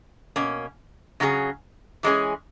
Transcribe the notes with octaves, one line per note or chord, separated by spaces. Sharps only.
B2 A#3 C#4
C#3 F#3 C#4 G#4
E3 G#3 C#4 G#4